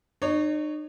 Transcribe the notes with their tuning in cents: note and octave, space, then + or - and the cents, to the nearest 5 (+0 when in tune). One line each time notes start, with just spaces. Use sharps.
D#4 -45 C#5 +0